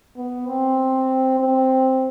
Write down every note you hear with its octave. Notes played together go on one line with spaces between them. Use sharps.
B3
C4
C4